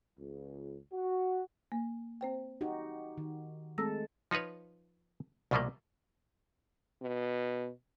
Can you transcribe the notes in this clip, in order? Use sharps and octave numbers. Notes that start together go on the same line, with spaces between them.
C#2
F#4
A#3
C4 C5 G5
D#4 F#4 G4
D#3
G#3 A3 C4 A4 E6 A#6
F3 D#4 F4 B4 C#5
C2 B2 F3 G3 A3 A#3
B2